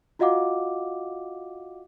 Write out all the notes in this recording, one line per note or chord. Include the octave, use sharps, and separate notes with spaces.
F4 F#4 D#5 F5 F#5 D6